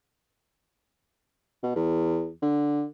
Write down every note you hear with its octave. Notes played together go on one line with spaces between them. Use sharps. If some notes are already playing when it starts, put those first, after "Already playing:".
B2
E2
D3